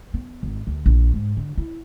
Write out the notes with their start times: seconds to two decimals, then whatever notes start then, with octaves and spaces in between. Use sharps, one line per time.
0.14 B3
0.43 G#1
0.67 D2
0.86 A#1
1.14 G#2
1.37 D3
1.57 E4